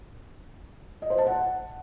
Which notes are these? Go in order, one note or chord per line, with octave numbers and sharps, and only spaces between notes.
D#5
C5
A5
F#5